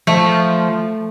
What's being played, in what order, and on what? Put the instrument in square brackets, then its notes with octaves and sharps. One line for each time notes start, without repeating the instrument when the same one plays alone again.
[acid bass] F3 [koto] A3